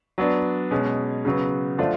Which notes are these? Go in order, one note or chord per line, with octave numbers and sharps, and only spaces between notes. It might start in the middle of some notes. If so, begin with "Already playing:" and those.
F#3 B3 D4
B2 G#3 C#4
C#3 F#3 B3
D3 F3 A3 D4 F4